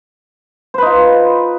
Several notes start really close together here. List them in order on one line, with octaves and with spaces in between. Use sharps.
C5 B4 D#4 F4